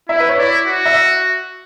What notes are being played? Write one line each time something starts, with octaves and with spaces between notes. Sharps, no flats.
E4 E5
B4
C#5
E4 D5
F#4
E5